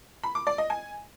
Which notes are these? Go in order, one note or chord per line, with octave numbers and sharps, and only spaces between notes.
B5
D6
D5
D#5
G#5